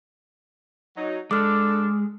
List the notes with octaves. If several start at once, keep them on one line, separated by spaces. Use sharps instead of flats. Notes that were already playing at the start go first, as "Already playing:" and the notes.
F#3 D#4
G#3 D4 A4 D6 F6